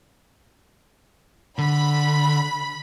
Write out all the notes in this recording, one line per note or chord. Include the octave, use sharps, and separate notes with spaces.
D3 B5